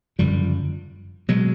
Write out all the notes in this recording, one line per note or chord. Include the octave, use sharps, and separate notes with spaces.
F#1 F#2 D3 F3 G3
B2 F#3 G#3